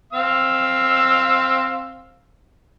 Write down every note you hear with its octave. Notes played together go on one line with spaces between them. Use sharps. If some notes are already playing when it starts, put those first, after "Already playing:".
C4 F5 E6